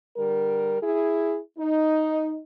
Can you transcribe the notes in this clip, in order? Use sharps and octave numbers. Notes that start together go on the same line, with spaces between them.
D3 G3 A#4
E4 G#4
D#4